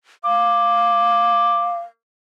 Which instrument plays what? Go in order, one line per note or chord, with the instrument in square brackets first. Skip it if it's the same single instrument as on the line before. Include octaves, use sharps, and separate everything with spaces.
[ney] F5 [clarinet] D6